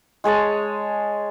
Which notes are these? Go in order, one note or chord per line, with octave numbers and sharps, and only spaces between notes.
G#3 G#4 C#5 A5